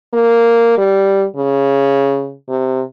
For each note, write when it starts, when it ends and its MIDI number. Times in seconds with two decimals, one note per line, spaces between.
0.14 0.76 58
0.78 1.25 55
1.37 2.34 49
2.49 2.81 48